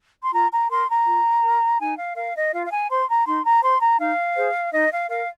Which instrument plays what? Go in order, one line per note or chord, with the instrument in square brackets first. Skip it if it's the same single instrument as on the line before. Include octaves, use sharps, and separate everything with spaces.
[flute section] C6
F4 A#5
A#5
A#4 C6
A#5
F4
A#4
D#4 G#5
F5
A#4 F5
D#5
F4 F5
F5
G#5
C5 C6
A#5
D#4 C6
A#5
C5 C6
A#5
D#4 F5
G#4 C5
D#4 D#5
F5
A#4 F5